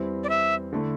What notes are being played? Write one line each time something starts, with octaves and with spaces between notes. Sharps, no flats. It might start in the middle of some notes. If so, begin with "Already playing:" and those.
Already playing: E2 E3 G3 C4 E4
D5
E5
D3 A3 E4